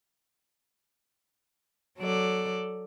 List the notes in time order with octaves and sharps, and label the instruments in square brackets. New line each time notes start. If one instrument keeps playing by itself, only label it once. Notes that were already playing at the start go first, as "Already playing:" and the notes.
[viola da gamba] F#3 A4 D5